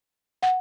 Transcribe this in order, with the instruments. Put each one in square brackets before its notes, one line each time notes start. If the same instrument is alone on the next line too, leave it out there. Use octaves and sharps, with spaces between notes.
[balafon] F#5